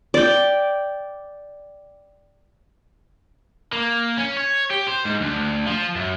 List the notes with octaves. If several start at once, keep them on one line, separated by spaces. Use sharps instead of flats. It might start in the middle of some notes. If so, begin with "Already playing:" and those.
D5 G5
A#3
C#4
C#5
G4
C5
G#2
D2
F3
F#2